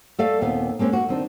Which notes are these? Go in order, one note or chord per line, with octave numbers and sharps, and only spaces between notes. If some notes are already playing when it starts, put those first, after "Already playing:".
A3 A4 D5 E5 F5
D#2 A#2 B3 C4 F5
G#3 A#3 C4 C#4
A#3 F#4
D#3 C4 D4